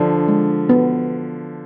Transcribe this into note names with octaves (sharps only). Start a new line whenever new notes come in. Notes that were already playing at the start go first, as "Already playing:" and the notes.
Already playing: D3 F3 D4
G#3
B3